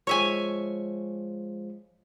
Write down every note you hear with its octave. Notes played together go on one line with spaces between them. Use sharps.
F3 G#3 C#5 E5 G#5